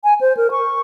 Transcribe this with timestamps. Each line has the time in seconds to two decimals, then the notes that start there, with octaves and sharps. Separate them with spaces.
0.04 G#5
0.21 C5
0.37 A#4
0.51 C#6